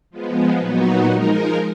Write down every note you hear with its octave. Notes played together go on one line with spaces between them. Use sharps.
F3 G#3 B3
A#2 F#3 B3 D#4 F#4
F3 G#3 D#4 A#4